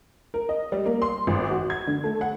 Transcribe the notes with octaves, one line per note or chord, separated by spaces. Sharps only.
A#4
D#5
G3
A#3
C6
G#1
F#4
G#6
D3
A3
F#5